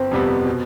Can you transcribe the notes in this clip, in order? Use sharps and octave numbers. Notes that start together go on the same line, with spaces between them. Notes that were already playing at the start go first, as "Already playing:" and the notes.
Already playing: G1 C4
F2 C3 G3 B3
B2